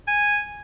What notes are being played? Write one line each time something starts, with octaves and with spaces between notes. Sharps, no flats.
G#5